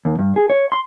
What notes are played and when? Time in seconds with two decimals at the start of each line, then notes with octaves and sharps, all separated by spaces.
0.05 D#2
0.19 G2
0.36 G#4
0.50 C#5
0.72 C6